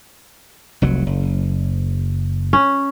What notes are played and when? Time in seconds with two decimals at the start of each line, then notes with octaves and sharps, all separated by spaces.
0.82 F1 C2 F#3
1.06 F#1
2.53 C#4